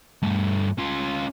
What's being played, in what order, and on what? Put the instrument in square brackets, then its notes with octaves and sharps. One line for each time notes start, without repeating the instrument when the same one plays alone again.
[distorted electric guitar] G2 A3
C#4 F4